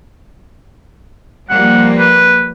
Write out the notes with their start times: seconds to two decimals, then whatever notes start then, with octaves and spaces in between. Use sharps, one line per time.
1.50 F3 G3 A#3 F#5
1.99 B4